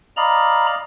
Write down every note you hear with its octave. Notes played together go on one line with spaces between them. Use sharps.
D5 D#5 F5 A#5 B5